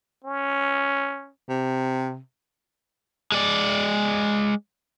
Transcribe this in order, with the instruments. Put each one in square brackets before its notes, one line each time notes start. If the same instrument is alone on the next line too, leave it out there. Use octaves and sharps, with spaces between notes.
[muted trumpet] C#4
[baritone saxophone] C3
[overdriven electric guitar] G#3 D5